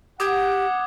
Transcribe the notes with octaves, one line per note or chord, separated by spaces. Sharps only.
G4 F#5 D6 D#6 G#6